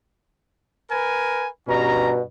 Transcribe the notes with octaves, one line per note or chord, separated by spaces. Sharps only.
A#4 B4 G#5
G2 B2 C#4 A#5